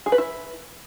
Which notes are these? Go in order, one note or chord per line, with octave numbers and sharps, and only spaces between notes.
G#4
B4
E4